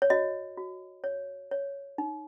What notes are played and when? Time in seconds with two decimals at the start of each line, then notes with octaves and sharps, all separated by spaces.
0.02 C#5
0.10 F#4 D#5
0.57 F#4
1.04 C#5
1.51 C#5
1.98 D#4